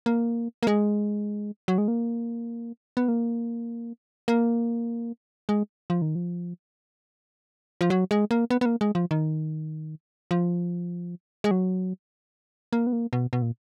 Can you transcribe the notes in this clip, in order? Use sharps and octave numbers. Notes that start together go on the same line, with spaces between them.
A#3
A#3
G#3
F#3
G#3
A#3
B3
A#3
A#3
G#3
F3
D#3
F3
F3
F#3
G#3
A#3
B3
B3
A#3
G#3
F3
D#3
F3
G#3
F#3
A#3
B3
A#3
B2
B2
A#2